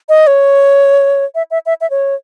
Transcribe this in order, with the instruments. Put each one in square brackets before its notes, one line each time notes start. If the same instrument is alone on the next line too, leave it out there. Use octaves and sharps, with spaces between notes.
[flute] D#5
C#5
E5
E5
E5
E5
C#5